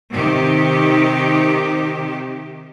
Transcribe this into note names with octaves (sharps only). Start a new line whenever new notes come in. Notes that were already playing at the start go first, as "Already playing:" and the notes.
C3 D#3 G4